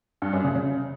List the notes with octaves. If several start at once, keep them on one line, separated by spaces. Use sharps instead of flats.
G2
F#2
C#3
C#3